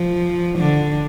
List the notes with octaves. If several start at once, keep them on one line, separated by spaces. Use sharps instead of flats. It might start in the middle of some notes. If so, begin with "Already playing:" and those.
Already playing: F3
D3